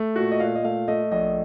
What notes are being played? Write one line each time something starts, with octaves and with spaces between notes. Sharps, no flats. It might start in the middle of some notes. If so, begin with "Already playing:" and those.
Already playing: A3
A#2 F#4
D#5
A#2 F5
D#5
A3 F5
A3 D#5
A#1 D#5